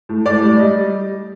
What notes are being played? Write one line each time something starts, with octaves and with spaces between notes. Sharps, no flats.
A2
A2 D5
G3
G3 D#5
G3